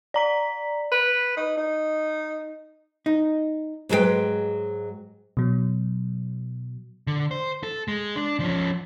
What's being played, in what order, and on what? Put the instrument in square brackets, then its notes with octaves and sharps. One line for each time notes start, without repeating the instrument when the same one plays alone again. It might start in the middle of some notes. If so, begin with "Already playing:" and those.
[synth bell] D5 A#5 B6
[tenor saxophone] B4
D#4
D#4
[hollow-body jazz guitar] D#4
[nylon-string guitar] G#2 F#3 G#3 A#4 B4 G5
[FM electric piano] B2 F#3
[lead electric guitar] D3
C5
A4
G#3
D4
F3 C#4